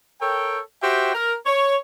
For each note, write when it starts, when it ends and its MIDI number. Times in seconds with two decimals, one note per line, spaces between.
0.21 0.59 69
0.21 0.59 70
0.21 0.59 73
0.21 0.59 79
0.82 1.11 66
0.82 1.11 67
0.82 1.11 72
0.82 1.11 76
0.82 1.11 79
1.14 1.33 70
1.46 1.76 73